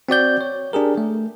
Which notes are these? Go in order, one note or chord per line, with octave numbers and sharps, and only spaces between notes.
C4 F#4 D5 G6
C#5
D4 G4 G#4 A#4
A3